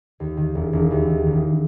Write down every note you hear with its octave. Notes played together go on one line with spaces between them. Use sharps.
D#2
D#3
E1
E1
D#2
D#3
E1